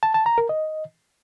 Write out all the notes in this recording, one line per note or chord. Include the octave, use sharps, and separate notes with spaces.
A5
A5
A#5
A#4
D#5